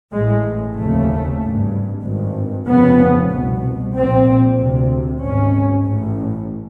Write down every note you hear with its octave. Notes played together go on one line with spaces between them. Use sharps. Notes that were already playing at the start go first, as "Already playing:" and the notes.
A1 A2 G#3
F1 D#2 C#3 A3
G#1 G2
G#1 G2
F1 F2 C#3 B3
C2 B2
A#1 A#2 C4
D2 C3
G#1 G#2 C#4
A1 A2